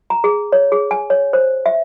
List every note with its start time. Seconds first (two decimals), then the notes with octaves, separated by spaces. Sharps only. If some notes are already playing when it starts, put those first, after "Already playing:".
0.10 A#5
0.24 G#4
0.52 C#5
0.72 G#4
0.91 G#5
1.10 C#5
1.33 C5
1.66 E5